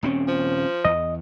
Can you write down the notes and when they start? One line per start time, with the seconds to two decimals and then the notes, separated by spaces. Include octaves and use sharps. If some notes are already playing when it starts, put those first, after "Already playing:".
0.03 D#1 C4 C#4
0.28 F3
0.85 E2 D#5